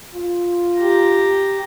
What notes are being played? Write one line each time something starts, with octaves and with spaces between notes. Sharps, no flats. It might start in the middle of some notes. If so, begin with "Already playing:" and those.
F4
G4 A#5